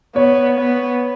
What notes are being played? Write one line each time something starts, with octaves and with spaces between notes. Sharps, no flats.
B3 C#5
B3